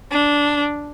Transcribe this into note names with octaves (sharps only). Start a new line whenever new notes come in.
D4